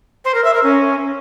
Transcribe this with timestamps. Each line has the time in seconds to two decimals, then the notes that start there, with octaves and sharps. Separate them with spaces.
0.25 C5
0.34 A#4
0.44 E5
0.54 A#4
0.63 C#4